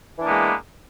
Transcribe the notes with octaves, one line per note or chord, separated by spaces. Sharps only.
E3 G#3 A#3 B3 D4